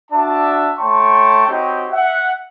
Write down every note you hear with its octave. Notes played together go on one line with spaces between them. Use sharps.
D4 F#4 D5 E5 A5
A3 C#5 G5 A5 C6 C#6
C4 D#4 F#4 G4 C#5 G5
E5 F#5